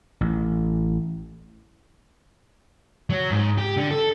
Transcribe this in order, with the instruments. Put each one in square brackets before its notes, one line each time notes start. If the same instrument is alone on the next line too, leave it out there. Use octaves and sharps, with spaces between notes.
[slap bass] A1
[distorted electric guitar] F#3
G#2
G4
D3
A4